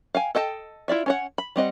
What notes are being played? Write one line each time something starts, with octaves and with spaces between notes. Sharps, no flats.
F5 G5 G#5
A4 D#5 G5 A5
E4 F4 D5 E5
C#4 C#5 F#5
B5
G3 C4 D#5 F#5